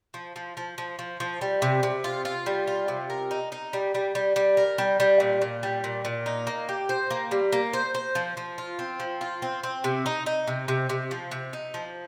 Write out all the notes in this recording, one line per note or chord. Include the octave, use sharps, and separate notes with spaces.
F3
F3
F3
F3
F3
F3
G3
C3
C3
F4
F4
G3
F4
C3
A#4
D#4
D#4
G3
G3
G3
G3
A#4
G3
G3
A#2
A#2
G3
A#2
A#2
D#4
A#3
G4
C5
A#3
G3
A#3
C5
C5
F3
F3
F4
C4
F3
F4
C4
C4
C3
D#4
D#4
C3
C3
C3
F3
C3
D#4
F3